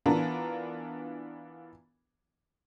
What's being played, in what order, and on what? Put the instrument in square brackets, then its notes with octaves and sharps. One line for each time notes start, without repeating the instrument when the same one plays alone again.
[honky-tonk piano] E3 B3 D4 F4 A#4